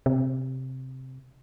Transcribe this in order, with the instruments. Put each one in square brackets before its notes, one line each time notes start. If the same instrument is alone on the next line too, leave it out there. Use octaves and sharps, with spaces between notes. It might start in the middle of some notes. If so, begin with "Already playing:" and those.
[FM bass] C3